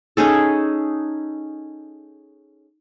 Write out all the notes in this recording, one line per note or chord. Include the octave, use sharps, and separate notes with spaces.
C#4 D#4 G#4 A4